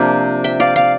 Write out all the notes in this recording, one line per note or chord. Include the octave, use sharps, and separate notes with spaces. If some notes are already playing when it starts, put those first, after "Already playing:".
Already playing: C3 F3 A#3 D4 D5 F5
E5 G5
D5 F5
D5 F5